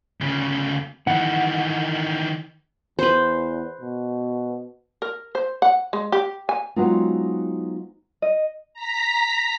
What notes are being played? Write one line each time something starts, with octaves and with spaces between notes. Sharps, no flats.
D2 C#3
D#3 E3 F#5
E2 B4 C5
B2
A#4
C5
F#5
G#3
G4
G#5
F#3 G#3 B3 C4 D#4 F4
D#5
A#5 B6